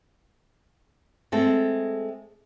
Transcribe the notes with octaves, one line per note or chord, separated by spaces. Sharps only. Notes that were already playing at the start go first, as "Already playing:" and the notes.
G#3 A3 C4 A4